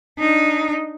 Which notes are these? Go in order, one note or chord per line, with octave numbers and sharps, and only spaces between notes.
D4 D#4